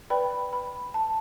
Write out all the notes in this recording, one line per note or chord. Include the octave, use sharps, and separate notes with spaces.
B4 D5 G5 B5
B5
A5